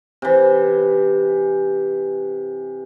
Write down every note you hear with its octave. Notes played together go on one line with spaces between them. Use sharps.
C3 E3